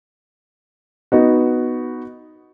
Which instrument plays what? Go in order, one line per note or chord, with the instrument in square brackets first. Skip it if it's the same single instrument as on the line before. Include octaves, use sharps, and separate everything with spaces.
[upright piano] B3 D#4 F#4